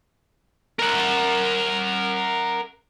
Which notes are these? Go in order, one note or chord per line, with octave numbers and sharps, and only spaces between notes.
A#4 F#5